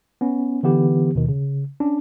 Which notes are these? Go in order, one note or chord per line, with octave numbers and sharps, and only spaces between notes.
B3 C#4
D3 E3 B3 G4
D#2 B2 D#3
C#3
C#4 D4